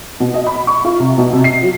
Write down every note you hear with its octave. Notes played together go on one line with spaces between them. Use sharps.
B2
D#5
B5
C#6
F4
C3
B2
C3
C7
F#3